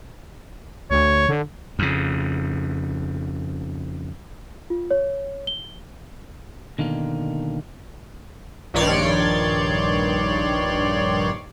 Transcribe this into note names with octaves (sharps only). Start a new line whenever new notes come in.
D2 C#5
D3
F2 C#3
F4
C#5
G7
B2 D3 D#3 A#3
A#1 G2 D#3 C#5 D5 C6